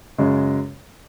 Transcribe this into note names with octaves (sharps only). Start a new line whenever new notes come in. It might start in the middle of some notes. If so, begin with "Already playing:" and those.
F#2 C#3 G#3